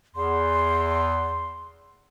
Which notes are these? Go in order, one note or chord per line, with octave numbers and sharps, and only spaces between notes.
E2 C6